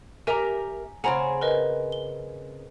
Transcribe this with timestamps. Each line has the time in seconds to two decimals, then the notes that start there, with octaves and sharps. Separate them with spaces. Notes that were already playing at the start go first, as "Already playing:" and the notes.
0.27 G4 A#4 E5 G#5 A#5
1.04 C#3 C4 G#4 F#5 A#5 B5
1.41 A#4 B4 D#5
1.92 G7